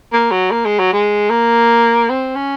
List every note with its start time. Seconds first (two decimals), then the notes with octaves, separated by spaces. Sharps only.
0.13 A#3
0.31 F#3
0.51 A#3
0.65 G#3
0.79 F#3
0.93 G#3
1.30 A#3
2.09 C4
2.35 C#4